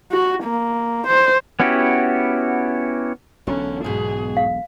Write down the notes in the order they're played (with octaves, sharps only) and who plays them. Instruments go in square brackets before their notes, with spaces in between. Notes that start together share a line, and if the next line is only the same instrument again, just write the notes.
[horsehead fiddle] F#4
A#3
C5
[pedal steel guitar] B3 C#4 E4 F#4 G4
[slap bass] E1 B1 [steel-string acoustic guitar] D3 [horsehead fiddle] C#4
[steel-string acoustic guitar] G#2 B2 [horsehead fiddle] G#4
[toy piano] F5